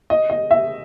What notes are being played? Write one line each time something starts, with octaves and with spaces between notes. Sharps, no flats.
D#5
D#5
E5